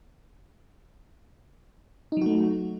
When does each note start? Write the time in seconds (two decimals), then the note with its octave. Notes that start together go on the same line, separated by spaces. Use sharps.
2.12 D#4
2.17 F#3
2.21 F#4
2.26 A3